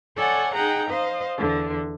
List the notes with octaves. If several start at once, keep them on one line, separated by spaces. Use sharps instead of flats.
A4 C#5 D5 F#5 G#5
D#4 G#4 F#5 G5 A#5
C5 D#5 F5
E2 D3